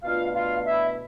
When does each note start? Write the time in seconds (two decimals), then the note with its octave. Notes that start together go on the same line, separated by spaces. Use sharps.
0.03 B2 A3 D4 F4 F5
0.34 F4 F5
0.65 E4 E5